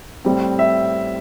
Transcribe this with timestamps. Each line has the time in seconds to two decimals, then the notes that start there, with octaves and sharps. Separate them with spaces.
0.25 A2 G3 C4
0.59 E5